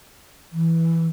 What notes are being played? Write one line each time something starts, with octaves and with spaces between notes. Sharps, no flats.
E3